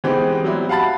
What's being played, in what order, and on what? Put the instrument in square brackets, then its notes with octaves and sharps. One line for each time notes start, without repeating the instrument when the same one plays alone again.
[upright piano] E3 G#3 B3 C4 D#4 G4
F#3 G3 E4
F5 F#5 A5 B5 A6